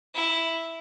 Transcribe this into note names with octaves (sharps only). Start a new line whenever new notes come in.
E4